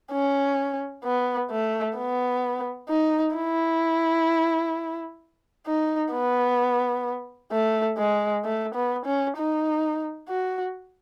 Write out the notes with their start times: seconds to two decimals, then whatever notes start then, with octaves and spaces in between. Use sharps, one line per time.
0.12 C#4
1.04 B3
1.51 A3
1.98 B3
2.89 D#4
3.36 E4
5.67 D#4
6.13 B3
7.52 A3
7.98 G#3
8.44 A3
8.75 B3
9.06 C#4
9.37 D#4
10.29 F#4